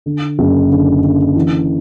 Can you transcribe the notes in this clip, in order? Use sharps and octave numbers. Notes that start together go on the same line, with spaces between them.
D3
F#1
D3
D3
E3